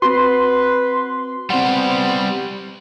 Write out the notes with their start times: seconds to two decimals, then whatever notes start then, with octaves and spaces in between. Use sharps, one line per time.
0.02 C4 F#4 B4 C6
1.50 G3 B3 C4 C5 F#5